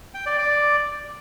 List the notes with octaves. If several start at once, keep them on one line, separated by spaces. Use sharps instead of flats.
G5
D5
D5